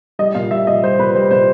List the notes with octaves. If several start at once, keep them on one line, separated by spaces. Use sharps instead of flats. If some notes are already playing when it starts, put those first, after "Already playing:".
G3 D#5
A#2 F5
G3 E5
A#2 D#5
G3 C5
A#2 B4
G3 C5
A#2 C5